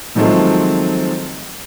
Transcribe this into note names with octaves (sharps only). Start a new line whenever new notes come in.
D#3 F3 F#3 G#3 A3 C4